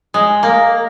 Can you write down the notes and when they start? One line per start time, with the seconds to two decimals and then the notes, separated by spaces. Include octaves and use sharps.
0.14 G#3
0.43 A#3